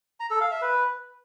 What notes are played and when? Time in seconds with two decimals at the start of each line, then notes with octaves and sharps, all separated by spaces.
0.20 A#5
0.30 A4
0.41 F5
0.51 E5
0.62 B4